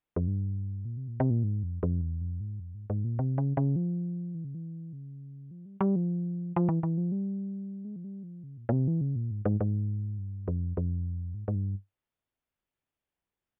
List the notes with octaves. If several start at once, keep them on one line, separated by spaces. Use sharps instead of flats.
F2
G2
A#2
C3
A#2
C3
A#2
G#2
F2
F2
E2
F2
G#2
F2
G#2
G#2
A#2
C3
C#3
C#3
F3
E3
C#3
E3
C#3
F3
G3
G3
F3
F3
E3
E3
F3
G3
G#3
F3
G3
F3
C#3
A#2
A#2
C3
E3
C#3
A#2
G#2
G#2
G#2
G2
F2
F2
G#2
G#2
G2